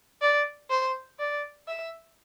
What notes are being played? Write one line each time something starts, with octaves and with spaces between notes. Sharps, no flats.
D5
C5
D5
E5